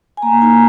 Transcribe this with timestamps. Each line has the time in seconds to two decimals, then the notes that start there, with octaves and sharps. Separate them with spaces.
0.17 G#5
0.22 A#3 A#5
0.41 D#4 G#5